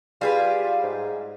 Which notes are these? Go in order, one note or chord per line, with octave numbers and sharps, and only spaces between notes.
G3 F4 G#4 B4
F4
G#2